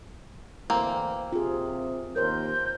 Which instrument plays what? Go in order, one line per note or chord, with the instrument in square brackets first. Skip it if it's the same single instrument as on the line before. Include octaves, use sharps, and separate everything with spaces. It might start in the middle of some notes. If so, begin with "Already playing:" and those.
[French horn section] D2 E3 [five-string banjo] A#3 C4
[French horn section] C3 [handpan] F4 G#4
[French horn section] D#2 [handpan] A#4 C5 [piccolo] G6